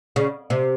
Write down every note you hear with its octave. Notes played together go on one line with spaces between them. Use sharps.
C#3
C3